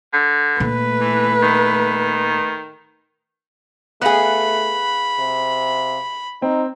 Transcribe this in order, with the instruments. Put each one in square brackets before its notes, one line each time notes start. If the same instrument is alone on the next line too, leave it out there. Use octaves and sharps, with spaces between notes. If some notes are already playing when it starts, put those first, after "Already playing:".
[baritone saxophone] D3
[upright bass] A#2 [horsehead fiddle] A3 B4
[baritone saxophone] E3
D#3
[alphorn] A3 [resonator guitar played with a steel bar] B3 G#4 [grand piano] F5 F#6 [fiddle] B5
[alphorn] C3
[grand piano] C4 [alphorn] D#4